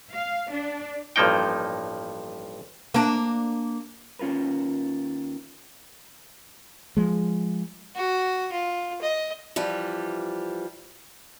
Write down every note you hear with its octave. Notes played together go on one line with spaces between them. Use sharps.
F5
D4
A1 G2 F3 A#3 D#4 G5
A#3 D4
D#2 C#4 F4 A#4 B4
F3 G#3
F#4
F4
D#5
E3 F3 G3